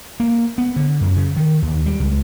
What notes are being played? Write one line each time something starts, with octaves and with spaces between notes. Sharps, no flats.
A#3
B3
D3
F#2
C#3
D#3
D#2
G3
C#2